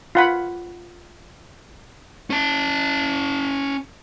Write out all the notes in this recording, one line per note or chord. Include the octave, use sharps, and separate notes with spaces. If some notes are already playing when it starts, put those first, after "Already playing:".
F4 F#5 B5
C#4 A5